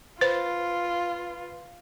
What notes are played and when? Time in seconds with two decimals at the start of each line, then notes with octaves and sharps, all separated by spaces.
0.21 F4 B4 C5